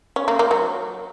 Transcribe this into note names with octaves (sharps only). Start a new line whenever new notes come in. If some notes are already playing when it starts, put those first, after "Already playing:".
C#4
A#3
A#3
F#3